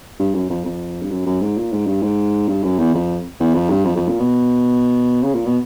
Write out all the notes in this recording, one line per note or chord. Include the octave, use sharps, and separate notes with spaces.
G2
F#2
F2
F2
G2
F#2
F#2
G#2
A#2
G#2
G2
G#2
G2
F#2
E2
F2
E2
F2
G2
F2
F2
A#2
B2
C#3
A#2
B2